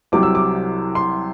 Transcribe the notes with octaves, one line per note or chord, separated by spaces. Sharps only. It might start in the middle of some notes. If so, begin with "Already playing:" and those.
C2 C3 F#3 D6
E6
D6
C6